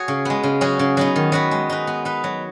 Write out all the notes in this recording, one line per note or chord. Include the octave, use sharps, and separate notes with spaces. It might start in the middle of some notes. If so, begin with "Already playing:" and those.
Already playing: F#4 G#4 C#5
C#3
G#3 B3
C#3
F#3 C#4 G#4
C#3
F#3 B3 D#4
D#3
F#3 B3 F#4 B4
G#3
D#4 B4
B3
D#4 B4
F#3